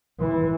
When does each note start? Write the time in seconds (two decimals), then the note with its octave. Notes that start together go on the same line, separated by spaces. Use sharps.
0.20 E3